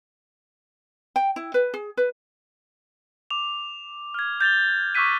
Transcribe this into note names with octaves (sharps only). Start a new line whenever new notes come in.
G5
E4
B4
G#4
B4
D6 F7
F6 G#6
G6 A6 F7 G7
C#6 D6 E6 F#6 B6 D#7